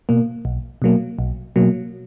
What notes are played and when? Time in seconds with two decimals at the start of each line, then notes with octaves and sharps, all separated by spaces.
0.09 B2 A#3
0.45 B1
0.82 B2 F#3 A#3
1.19 B1
1.56 B2 F#3 A#3